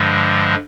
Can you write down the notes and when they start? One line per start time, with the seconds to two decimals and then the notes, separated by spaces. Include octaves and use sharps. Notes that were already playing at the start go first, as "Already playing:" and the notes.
Already playing: G2 D3 F3 G#3